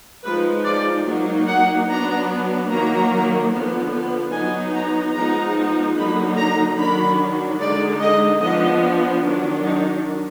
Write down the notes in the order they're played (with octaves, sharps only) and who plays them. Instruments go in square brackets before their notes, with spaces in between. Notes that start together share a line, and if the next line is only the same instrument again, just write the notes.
[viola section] F3 G#3 D#4 B4
D5
F#3 A#3 D#4
F#5
F#3 B3 D4 A#5
D#3 F#3 A#3 D#4 A#5
D3 F3 B3
F#3 B3 D#4 G#5
A#5
F3 G#3 B3 D#4 A#5
D3 F#3 A#3 D#4 B5
A#5
D#3 F#3 D4 B5
D3 G#3 D#4 D5
D#5
F3 B3 D4 D#5
D#3 F#3 D4
D#4